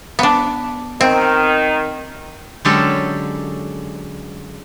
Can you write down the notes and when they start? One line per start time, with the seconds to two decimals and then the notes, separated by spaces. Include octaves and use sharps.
0.19 B3 D4
1.01 D#3 C4
2.65 D3 F#3 G#3 C#4 G4 A4